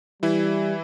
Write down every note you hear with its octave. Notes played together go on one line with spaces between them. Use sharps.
E3 G3 E4